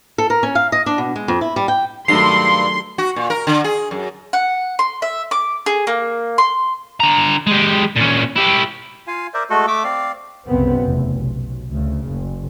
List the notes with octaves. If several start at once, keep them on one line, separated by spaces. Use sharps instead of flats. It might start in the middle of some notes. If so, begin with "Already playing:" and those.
A4
A#4
C#4
F5
D#5
D4
B2
G#3
F2
E4
G3
G5
G2 D#3 F#3 A3 C6 C7
F#4
A#2
A#4
D3
G#4
F#2
F#5
C6
E5
D6
G#4
A#3
C6
D3 A#5
G#3 G4
A#2 C#4
E4 G4
F4 F5 G#5
A#4 C5 D5 E5
G#3 A3 F#4 A4
A3 E5 D6 E6
C4 D5 F5
C2 F#2 C#3 B3 C4
F1 E2
B1
D2 C#3
F#1